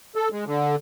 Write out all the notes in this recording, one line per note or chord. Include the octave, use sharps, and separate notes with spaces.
A4
G#3
D3